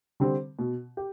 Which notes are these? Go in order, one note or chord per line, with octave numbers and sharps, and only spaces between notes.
D3 G3 C4
B2
G4